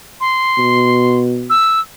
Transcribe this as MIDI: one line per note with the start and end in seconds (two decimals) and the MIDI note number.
0.21 1.16 84
0.58 1.53 47
1.50 1.80 88